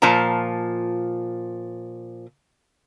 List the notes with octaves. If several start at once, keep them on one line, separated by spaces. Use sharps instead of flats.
A#2 F3 A5 A#5